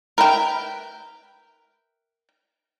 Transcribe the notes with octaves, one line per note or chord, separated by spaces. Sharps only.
A#4 B4 E5 G5